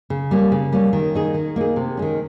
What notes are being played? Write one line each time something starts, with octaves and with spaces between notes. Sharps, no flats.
C#3
G3 A#3 C#4
C#3
G3 A#3 C#4
D#3
A#3 D#4 G#4
D#3
A#3 D#4 G#4
C3
D#3 G#3 C#4